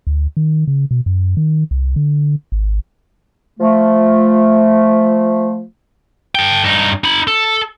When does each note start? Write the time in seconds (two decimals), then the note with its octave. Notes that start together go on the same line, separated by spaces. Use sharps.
0.07 D2
0.37 D#3
0.68 C#3
0.91 B2
1.06 F#2
1.37 D#3
1.71 C2
1.96 D3
2.52 G#1
3.59 F3 A3
6.35 A4 G5
6.64 G2 D#4
7.04 D#4 B5
7.27 A4